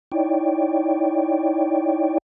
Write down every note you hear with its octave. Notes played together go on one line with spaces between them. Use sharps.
D#4 E4 C#5 D5 G5